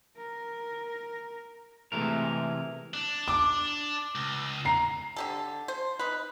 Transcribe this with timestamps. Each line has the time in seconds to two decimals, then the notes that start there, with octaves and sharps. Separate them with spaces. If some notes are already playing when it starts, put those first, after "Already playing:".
0.17 A#4
1.92 C3 E3 G#3 A3 A#4
2.94 D4
3.28 D6
4.15 C#2
4.65 A#5 C7
5.16 D3 G4 A4
5.68 C5
5.99 D#4 B4